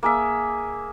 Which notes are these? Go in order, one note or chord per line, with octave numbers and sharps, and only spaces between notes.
A#3 G#4 E5